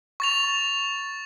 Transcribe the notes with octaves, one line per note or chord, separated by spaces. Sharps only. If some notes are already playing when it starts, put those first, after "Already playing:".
C#6 A6 F7